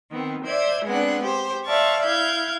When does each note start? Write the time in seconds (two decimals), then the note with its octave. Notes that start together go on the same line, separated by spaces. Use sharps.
0.10 D#3 B3 C4
0.44 C5 D5 E5 G#6
0.84 G#3 B3 C4 D4 F#5
1.22 G4 C5
1.65 C5 D5 E5 F5 A5 C#6
2.04 E4 F5 G6 G#6